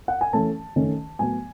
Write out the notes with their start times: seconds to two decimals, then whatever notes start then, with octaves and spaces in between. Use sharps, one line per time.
0.08 F#5
0.21 G#5
0.33 E3 A3 C#4 A5
0.76 D#3 A3 C#4
1.19 A2 F#3 B3 G#5